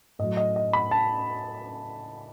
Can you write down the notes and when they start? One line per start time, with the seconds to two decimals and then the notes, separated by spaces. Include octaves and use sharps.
0.19 A2 F#3 D#5
0.37 D#5
0.56 D#5
0.73 B5
0.91 A5